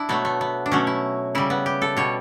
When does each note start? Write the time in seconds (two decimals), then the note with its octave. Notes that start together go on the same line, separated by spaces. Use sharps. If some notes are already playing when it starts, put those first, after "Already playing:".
Already playing: D4 E4
0.09 B2 F#3 A3 B3
0.25 A3
0.41 B3
0.66 D4
0.71 B2 F#3 A3 C#4
0.87 E4
1.35 C#3 G3 E4
1.50 B3
1.66 G4
1.82 A4
1.97 B2 G3 C#5